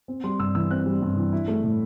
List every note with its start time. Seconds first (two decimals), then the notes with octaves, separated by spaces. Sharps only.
0.08 C4
0.24 G3 C6
0.39 G2 E6
0.55 E3 E6
0.71 C4 F#6
0.86 G3
1.01 G2
1.17 E3
1.33 E4
1.48 A3
1.64 A2